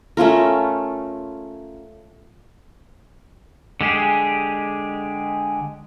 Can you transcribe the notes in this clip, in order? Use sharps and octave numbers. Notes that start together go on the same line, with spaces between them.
A3 C#4 F4 A#4
D3 G#3 G4 G#4